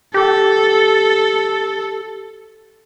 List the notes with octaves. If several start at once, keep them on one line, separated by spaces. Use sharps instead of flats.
G4 A4